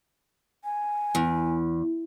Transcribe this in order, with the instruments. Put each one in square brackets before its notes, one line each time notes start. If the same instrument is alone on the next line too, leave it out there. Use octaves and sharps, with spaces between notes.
[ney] G#5
[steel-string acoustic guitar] E2